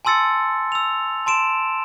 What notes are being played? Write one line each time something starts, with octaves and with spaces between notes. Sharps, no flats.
G#5 A5 C6 E6 A6 C#7
E6 F7
A5 C6 D7 E7